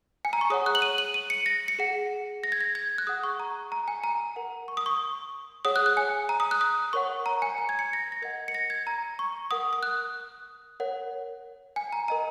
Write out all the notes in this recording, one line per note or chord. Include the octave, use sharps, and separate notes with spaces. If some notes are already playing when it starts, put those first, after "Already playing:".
G#5
A#5
C#6
G#4 C#5 F#5 D#6
F#6
F#7
D#7
F#7
D#7
C#7
A#6
C#7
G#4 F#5
A#6
G#6
A#6
G#6
F#6
G#4 F#5 D#6
C#6
A#5
A#5
G#5
A#5
A#4 F#5
C#6
D#6
C#6
G#4 C#5 F#5 D#6
F#6
F#6
G#5
A#5
D#6
F#6
D#6
A#4 C#5 F#5 C#6
A#5
G#5
A#5
G#6
C#7
A#6
C#7
A#6
A#4 D#5 F#5 G#6
C#7
A#6
G#6
A#5
C#6
A#4 F#5 D#6
D#6
F#6
A#4 C#5 F#5
G#5
A#5
A#4 D#5 F#5 A#5